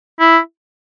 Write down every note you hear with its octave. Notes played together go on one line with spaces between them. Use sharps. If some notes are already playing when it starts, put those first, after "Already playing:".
E4